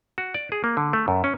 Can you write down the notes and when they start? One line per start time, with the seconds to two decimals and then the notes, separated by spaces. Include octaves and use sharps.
0.18 F#4
0.34 D5
0.52 G#4
0.64 A#3
0.77 D3
0.93 A3
1.08 F#2
1.24 C#4